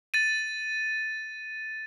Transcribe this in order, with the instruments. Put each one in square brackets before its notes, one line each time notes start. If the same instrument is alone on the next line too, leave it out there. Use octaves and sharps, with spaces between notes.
[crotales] A6 D#7